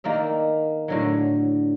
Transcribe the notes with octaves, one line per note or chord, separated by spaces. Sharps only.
D#3 A#3 D5 E5
A2 D3 F#3